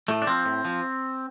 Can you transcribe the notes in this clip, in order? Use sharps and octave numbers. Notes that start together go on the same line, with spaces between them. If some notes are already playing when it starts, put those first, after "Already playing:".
A2 A3
D4
F3 C4
A2
F3